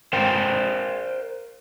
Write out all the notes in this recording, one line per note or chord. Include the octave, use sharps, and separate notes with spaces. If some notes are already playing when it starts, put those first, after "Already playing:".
A#4 C5 F5 G5